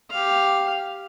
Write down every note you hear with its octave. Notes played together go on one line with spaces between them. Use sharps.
G4 F5